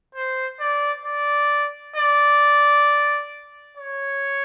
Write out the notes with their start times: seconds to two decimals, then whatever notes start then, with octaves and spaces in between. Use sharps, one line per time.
0.15 C5
0.60 D5
1.06 D5
1.96 D5
3.78 C#5